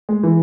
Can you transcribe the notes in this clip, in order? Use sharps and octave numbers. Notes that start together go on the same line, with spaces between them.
G#3
E3